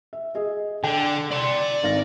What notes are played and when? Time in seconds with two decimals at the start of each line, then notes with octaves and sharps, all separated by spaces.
0.13 E5
0.35 G#4 D#5
0.84 D3 G5
1.31 D5 C6
1.83 G#1 F5 A#6